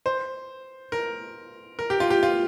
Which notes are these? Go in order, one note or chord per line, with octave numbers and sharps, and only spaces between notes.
C5
A#4
A#4
G4
F4
G4
F4